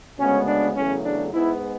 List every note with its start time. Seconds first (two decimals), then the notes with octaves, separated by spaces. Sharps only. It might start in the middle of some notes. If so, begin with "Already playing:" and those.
0.19 D2 C#3 G#3 B3 C#4
0.48 D4
0.76 E2 C#3 F#3 A3 C#4
1.04 D4
1.32 G#2 G#3 B3 E4